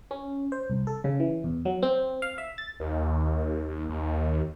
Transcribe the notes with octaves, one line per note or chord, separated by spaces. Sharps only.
C#4
C5
C2
A4
C#3
E3
E2
F#3
C4
F5
E5
A6
D#2
D#2